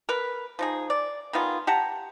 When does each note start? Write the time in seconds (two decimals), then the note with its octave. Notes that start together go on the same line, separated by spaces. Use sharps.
0.09 A#4 B4
0.59 F3 D#4 G#4
0.90 D5
1.33 D#3 B3 F4 G#4
1.67 G4 F#5 A5 A#5